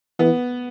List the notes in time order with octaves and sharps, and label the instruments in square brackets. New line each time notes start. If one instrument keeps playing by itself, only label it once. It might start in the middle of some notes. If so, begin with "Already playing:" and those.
[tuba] E3 [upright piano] B3